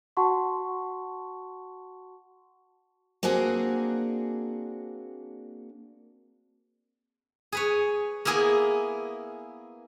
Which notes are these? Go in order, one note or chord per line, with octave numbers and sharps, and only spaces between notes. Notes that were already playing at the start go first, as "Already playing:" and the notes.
F#4 F#5 A5 C6 C#6
A#3 C4 D4 F#4 G#4
G#4 B4 C#5
A#3 B3 E4 G#4 A#4